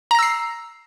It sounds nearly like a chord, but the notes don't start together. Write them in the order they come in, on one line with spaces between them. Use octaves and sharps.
A#5 A#6 E6 C7